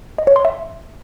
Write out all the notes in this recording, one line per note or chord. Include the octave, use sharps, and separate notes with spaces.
D#5
C#5
C6
E5